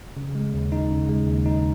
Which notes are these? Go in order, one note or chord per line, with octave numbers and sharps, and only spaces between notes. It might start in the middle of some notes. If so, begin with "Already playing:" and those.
C#3
G#3
D#2
D#4
C#3
G#3
D#2
D#4